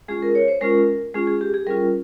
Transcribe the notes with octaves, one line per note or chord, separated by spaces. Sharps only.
G#3 C#4 F4 G#4
A#4
C#5
C5
G#3 C#4 F4 A#4
G#3 C#4 F4 G#4
G#4
G4
G#4
G3 C#4 F4 A#4